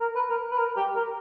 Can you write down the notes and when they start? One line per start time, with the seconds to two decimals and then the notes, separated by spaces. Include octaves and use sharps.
0.01 A#4
0.15 B4
0.30 A#4
0.51 B4
0.58 A#4
0.77 G4
0.96 A#4